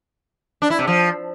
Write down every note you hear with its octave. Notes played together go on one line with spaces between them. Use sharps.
D4
E4
C3
F3